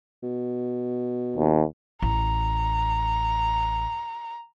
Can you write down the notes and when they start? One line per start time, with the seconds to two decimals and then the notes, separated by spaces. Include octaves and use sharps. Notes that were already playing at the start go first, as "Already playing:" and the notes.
0.23 B2
1.37 D#2
2.02 A1 A#5